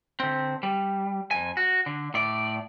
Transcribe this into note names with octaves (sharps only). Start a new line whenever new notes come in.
D3 C4
G3
F2 G#5
F#4
D3
A2 D5